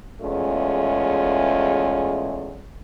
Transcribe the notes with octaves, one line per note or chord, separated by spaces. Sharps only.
E2 G#3 A3 C#4 F4